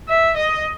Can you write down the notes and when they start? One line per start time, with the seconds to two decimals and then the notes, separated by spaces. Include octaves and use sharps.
0.09 E5
0.37 D#5